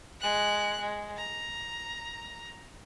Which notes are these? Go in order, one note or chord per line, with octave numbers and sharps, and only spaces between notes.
G#3 F#6
G#3
A#5